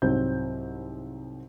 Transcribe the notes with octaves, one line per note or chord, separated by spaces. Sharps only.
C2 G#2 F#3 C4 G6